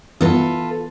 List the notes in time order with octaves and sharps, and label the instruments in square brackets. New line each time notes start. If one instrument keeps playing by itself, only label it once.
[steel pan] E3 B3 [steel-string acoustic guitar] F4 A4 B4